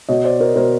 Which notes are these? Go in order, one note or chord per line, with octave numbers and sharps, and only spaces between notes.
B2 C#5 D#5
C5 D5
A#4 C5
B2 A#4 C5